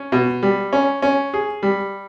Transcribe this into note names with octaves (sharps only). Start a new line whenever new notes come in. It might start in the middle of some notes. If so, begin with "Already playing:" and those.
Already playing: C#4
B2
G3
C#4
C#4
G#4
G3